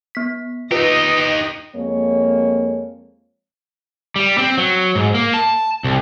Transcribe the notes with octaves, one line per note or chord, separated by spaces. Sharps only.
B3 B6
D#4 F4 G4 B4 D#5
F2 G#3 A#3 C#5
G3
C4
F#3
G#2
A#3
A5
C2